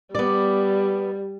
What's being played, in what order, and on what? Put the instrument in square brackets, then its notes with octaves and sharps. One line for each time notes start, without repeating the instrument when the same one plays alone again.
[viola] G3 [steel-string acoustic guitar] B3 D5